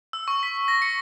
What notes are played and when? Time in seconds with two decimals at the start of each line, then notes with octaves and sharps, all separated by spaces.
0.13 E6
0.28 C#6
0.43 B6
0.68 A#6
0.82 C#7